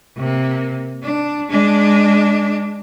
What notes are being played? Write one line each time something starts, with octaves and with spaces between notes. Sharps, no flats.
C3 A#3
D4
G#3 D4